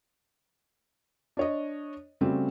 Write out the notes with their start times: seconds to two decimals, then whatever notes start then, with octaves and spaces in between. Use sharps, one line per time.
1.37 D4 C#5 D#5
2.21 C#3 G3 A3 C4 F#4